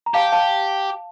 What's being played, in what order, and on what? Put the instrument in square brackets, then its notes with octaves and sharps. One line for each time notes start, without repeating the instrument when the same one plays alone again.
[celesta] A#5
[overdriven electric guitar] G4 [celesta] F5 A5
[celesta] F5 A5